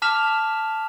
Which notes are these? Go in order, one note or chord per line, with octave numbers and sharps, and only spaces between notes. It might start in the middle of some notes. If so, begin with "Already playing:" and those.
A5 D6 F6 B6 E7 F7